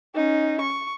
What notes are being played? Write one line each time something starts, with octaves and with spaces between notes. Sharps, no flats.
C#4 D#4
C#6